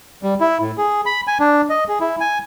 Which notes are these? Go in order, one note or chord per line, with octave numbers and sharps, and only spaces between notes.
G3
E4
A2
G#4
B5
G#5
D4
D#5
G#4
E4
G#5